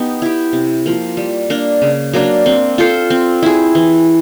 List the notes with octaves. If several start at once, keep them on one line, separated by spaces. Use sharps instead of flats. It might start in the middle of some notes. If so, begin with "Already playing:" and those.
Already playing: B3 D#4 G4
E4 G4
C3
F3 A#3
G3
A#3 D4
C#3
F#3 A#3 D4
C4
F4 A4 C5
C4
E4 G#4
E3